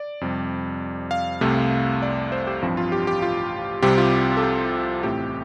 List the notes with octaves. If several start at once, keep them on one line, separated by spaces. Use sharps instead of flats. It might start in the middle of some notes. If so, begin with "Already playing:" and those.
Already playing: D5
F2 C3 G3
F5
C2 C3 A3 C4
D5
C5
G4
A1 G2 F3 C4
F4
G4
G4
F4
C2 C3 G3 C4 G4
F4
A4
G4
A1 A2 A3 C4 G4